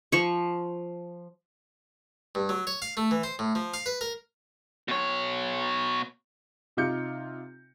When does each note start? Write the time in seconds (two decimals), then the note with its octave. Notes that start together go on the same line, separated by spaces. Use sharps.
0.12 F3 C#6
2.35 G2
2.49 F#3
2.67 C#5
2.82 F5
2.97 A3
3.11 E3
3.23 C5
3.39 A2
3.55 F3
3.74 F5
3.86 B4
4.01 A#4
4.88 B2 C#5
6.77 C3 D#4 F4 D6 G6 C#7